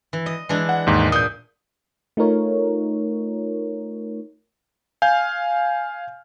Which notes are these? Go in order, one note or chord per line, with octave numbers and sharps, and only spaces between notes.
E3
D#5
E3 G#3 D4
F#5
D#2 G#2
A#2 D#6 G6
A3 D#4 F4 A#4 C#5
F5 G#5 F6 G6